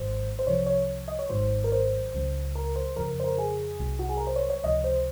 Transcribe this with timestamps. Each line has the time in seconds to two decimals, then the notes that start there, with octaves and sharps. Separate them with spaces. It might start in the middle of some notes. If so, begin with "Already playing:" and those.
Already playing: G#1 G#2 D#3 F#3 C5
0.39 C5
0.47 C2 C3 F3 C#5
0.66 C#5
1.08 D#5
1.19 C#5
1.29 G#1 G#2 D#3 F#3 C5
1.64 A#4
1.72 C5
2.14 C#2 C#3 F#3
2.55 A#4
2.76 C5
2.96 F2 C#3 F3 A#4
3.20 C5
3.24 A#4
3.38 G#4
3.80 C2 C3 F#3
3.99 F#4
4.09 G#4
4.17 A#4
4.27 C5
4.36 C#5
4.50 C#5
4.64 C#2 C3 F3 D#5
4.84 C5